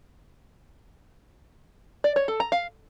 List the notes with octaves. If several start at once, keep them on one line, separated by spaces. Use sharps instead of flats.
D5
C#5
A4
A#5
F5